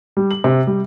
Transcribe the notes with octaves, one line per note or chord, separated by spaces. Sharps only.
G3
F#7
C3
G3